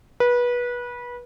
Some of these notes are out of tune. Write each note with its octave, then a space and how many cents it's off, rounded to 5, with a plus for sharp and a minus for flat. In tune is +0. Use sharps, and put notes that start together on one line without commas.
B4 -25